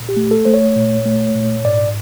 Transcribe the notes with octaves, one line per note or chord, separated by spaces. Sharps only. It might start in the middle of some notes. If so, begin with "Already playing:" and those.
Already playing: A#2
G4
A3
A4
A3 C5
C#5
A#2
A3
A#2
G#2 D5